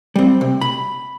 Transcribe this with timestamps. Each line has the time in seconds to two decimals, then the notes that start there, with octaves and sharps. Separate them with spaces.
0.16 G3 C4
0.41 C3
0.61 B5